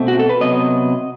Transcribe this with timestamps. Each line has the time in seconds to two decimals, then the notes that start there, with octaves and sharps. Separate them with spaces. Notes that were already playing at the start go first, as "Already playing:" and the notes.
Already playing: B2 A3 C4
0.08 F#4
0.19 A4
0.29 B4
0.41 C3 F#3 B3 D#5